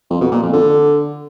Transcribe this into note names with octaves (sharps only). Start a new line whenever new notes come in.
F2
B2
A#2
F2
D3